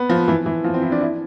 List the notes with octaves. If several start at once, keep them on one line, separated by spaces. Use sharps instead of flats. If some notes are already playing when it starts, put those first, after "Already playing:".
Already playing: B3
F3
E3
E3
F3
C4
E4
D4
E4